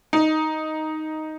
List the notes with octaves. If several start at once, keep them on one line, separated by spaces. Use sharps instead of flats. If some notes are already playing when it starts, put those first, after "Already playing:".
D#4